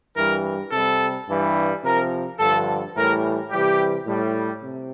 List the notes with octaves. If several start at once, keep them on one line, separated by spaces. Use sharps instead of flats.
G2 E3 G3 A#4
C3 G3 A4
G2 E3 G3
C3 F3 A#4
G2 D3 F3 A4
A2 E3 G3 A#4
C3 E3 G3 G4
A2 G3
C3